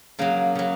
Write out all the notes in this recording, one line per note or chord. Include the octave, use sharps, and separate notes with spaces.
C#3 F#3 A#3
C#3 F#3